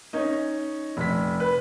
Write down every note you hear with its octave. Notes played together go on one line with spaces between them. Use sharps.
C#4 D#4 D#5
F1 B6
B4